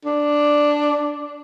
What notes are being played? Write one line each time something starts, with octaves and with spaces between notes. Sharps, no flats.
D4